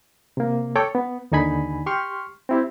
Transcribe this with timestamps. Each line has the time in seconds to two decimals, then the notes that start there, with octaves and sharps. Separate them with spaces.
0.37 C3 A#3
0.76 A4 C#5 G5 D6
0.95 B3
1.32 D#2 D3 D#4 G#5 B5
1.86 G4 C6 C#6 F6
2.49 C4 E4 G4